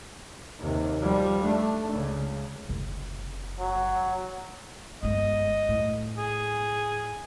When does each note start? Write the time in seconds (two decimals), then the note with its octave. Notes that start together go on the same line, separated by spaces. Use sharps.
0.59 D#2 C3
1.01 F3 G3
1.43 A3 D4
1.93 C#2 C#3
2.69 F#1 C3
3.59 F#3
5.03 G1 G#3 D#5
5.69 A2
6.18 G#4